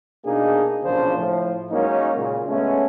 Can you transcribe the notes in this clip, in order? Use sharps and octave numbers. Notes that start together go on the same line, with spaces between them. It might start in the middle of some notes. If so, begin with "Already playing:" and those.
B2 A#3 D4 D#4 G#4
B1 A#2 C#3 F3 D4 C5
A2 F3
F#3 G#3 A#3 C#4 D#4
A#2 C#3
G#3 A3 B3 C#4